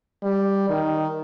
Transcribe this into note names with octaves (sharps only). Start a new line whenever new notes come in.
G3
D#3